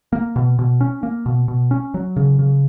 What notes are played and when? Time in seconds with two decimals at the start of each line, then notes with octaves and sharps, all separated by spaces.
0.13 A#3
0.36 B2
0.59 B2
0.81 C#4
1.03 A#3
1.26 B2
1.48 B2
1.71 C#4
1.94 F#3
2.16 C#3
2.39 C#3